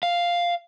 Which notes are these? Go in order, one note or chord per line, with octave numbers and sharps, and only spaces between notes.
F5